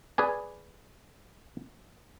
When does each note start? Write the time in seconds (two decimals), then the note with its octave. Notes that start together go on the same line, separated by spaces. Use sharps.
0.18 G#4 B4 D5 G#5